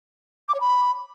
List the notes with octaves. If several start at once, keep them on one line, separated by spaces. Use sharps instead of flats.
D6
C#5
B5